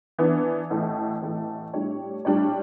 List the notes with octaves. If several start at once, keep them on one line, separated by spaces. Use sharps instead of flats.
E3 B3 D4
A1 A2 E3 A3
A1 A2 E3 A3
A2 G3 D4 G4 C#5
A2 G3 D4 G4 C#5